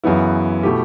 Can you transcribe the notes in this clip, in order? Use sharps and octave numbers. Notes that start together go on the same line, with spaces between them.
F#2 C#3 E3 B3 E4
B2 A3 E4 G4